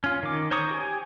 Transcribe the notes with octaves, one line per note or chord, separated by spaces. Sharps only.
C#4 F4
D#3 D6
C5 C#5 A#5 C#6 D#6
G4 G#5